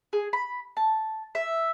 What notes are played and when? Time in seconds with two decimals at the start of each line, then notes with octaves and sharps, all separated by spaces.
0.13 G#4
0.33 B5
0.77 A5
1.35 E5